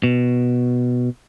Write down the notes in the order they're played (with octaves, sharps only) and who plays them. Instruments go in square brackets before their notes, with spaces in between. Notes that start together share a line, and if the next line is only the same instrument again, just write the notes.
[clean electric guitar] B2